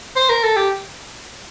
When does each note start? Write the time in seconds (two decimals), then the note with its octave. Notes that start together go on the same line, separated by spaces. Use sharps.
0.16 C5
0.29 A#4
0.44 A4
0.56 G4